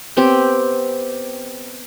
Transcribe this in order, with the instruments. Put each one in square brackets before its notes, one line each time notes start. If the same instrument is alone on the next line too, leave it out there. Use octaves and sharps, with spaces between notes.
[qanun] B3 C4 G4